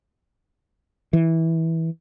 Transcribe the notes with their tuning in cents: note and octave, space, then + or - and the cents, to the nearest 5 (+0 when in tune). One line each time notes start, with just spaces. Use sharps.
E3 -15